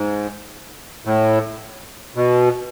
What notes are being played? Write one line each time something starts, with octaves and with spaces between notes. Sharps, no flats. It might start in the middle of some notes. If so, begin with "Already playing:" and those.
Already playing: G#2
A2
B2